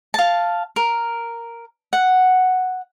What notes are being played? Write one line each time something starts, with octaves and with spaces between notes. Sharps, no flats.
F5 A5
A#4
F#5